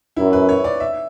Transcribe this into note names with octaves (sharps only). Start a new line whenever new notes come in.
F#2 E4
B4
C#5
D5
E5